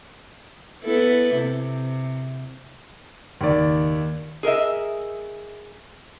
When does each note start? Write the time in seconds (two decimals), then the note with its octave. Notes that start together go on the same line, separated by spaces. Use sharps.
0.84 B3 E4 A4
1.36 C3
3.41 F#1 D#2 D#3 D5
4.43 G#4 A#4 D#5 E5